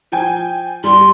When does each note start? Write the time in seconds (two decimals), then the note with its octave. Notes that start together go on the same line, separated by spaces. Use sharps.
0.12 F3 G5 G#5
0.84 G3 C6